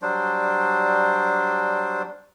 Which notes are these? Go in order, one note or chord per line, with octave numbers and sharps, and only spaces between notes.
F#3 G3 D4 C5